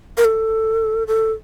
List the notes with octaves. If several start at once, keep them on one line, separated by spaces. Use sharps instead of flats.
A#4
A4
A4